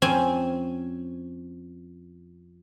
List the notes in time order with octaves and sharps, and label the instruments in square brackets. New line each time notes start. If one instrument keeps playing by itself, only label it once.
[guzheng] F2 C4 C#4 G#5